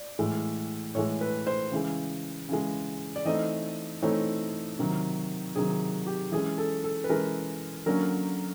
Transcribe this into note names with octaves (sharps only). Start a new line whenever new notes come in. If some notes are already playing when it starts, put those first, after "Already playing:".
Already playing: D5
A2 E3 G#3
A2 E3 G#3 C#5
B4
C5
C#3 E3 G#3
C#3 E3 G#3
D5
E3 A3 C4 D#4 D#5
E3 A3 C4 D#4 C#5
C3 D#3 F#3
C3 D#3 F#3 G#4
G4
E3 G#3 C#4 G#4
A4
A4
B4
E3 G#3 C#4 A#4
D3 F#3 A#3 C#4 A#4